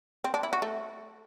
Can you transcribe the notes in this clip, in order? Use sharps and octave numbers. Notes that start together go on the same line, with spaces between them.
C4
D4
E4
F#4
A3